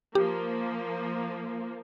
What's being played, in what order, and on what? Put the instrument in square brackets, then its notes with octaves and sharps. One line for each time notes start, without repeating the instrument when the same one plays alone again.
[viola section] F3 A#3 [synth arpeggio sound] G4